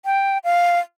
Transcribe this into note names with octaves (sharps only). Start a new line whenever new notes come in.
G5
F5